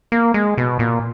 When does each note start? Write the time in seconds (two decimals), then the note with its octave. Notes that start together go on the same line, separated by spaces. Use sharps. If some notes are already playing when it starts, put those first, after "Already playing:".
0.12 A#3
0.34 G#3
0.58 B2
0.79 A#2